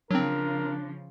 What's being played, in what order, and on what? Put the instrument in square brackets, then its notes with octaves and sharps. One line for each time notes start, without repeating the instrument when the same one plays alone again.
[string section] C#3 F3 [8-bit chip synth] F#3 C4 [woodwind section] D4 [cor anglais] A#4